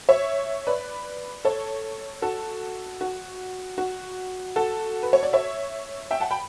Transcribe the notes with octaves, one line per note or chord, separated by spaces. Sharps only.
C#5 E5
B4 D5
A4 C#5
F#4 A4
F#4
F#4
F#4 A4
B4
C#5
D5
C#5 E5
E5 G5
F#5 A5
G5 B5